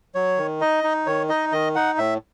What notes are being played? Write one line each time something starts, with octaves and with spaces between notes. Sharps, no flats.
F#3 C#5
D#3
D#4 D#5
D#4
D#3 C#5
D#4 D#5
D#3 D#5
D#4 F#5
A2 E5